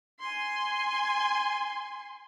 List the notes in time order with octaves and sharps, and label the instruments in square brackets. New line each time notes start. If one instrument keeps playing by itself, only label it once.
[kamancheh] G#5 C6